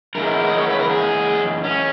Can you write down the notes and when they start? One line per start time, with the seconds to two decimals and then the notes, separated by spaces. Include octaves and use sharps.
0.15 F#2 E3 G#3 A#4
0.48 D#5
0.58 C#5
0.68 B4
0.80 A#4
0.90 G#4
1.64 C#4